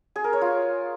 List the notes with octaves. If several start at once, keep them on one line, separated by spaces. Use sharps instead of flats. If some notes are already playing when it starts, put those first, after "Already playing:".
G#4
A#4
C#5
F4